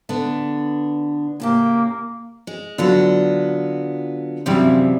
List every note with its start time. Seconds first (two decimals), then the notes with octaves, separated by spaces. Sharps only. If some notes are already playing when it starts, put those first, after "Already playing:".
0.09 D3 B3 D4
1.40 A2 C#3 A#3 G4
2.47 G#3
2.78 D3 F#3 B3 F4
4.46 F#2 C3 E3 F3 G3 E4